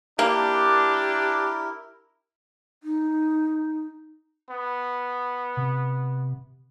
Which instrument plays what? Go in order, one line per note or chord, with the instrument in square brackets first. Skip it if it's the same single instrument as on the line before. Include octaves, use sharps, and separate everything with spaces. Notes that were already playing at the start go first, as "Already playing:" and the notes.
[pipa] A#3 [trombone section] D4 [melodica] E4 A#4 [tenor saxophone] G4
[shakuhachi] D#4
[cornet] B3
[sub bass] C3